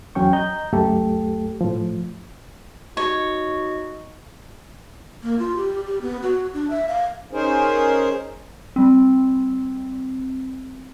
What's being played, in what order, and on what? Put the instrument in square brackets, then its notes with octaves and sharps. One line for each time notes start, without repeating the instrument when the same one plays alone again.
[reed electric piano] E2 F#3 C#4 G5 C#6
D#5 A#5 G6
C#2 F#2 A3 G4 A4
A2 F3
[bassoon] D#4 [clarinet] F#4 [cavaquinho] C#5
[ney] A#3
F4
G4
G4
B3
F#4
D4
E5
F5
[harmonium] C#4 D#4 G#4 A#4 C5
[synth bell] G3 C4